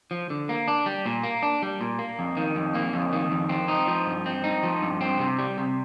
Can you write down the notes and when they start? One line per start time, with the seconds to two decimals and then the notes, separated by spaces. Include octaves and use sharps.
0.11 F3
0.30 D3
0.49 A#3
0.68 D4
0.86 G3
1.06 A#2
1.23 A#3
1.43 D4
1.62 G3
1.81 A#2
1.99 A#3
2.19 F2
2.37 D#3
2.55 F2
2.74 A#3
2.93 F2
3.13 D#3
3.31 F2
3.49 C4
3.68 D#4
3.88 F3
4.06 G2
4.26 C4
4.44 D#4
4.63 F3
4.82 G2
5.01 C4
5.19 C3
5.39 G3
5.58 C3